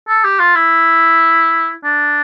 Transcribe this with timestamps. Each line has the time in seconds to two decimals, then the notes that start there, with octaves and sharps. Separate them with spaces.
0.08 A4
0.24 G4
0.39 F4
0.56 E4
1.84 D4